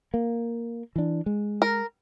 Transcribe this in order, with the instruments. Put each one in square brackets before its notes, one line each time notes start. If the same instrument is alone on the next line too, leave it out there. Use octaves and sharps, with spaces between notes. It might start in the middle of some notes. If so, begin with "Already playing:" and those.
[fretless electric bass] A#3
E3 D4
G#3
[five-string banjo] A#4